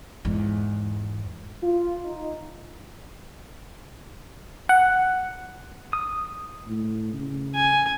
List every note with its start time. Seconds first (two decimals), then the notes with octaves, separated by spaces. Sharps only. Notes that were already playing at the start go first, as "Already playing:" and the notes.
0.25 E2 G#2
1.62 F4
2.04 D#4
4.69 F#5
5.93 D#6
6.67 A2
7.13 C#3
7.55 G#5